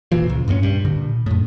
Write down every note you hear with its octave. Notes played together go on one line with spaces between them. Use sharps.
E1 A#2 E3 F3
C#2
G2 A#2 A#3 C#4
G2
A#2 D3
F#2 A2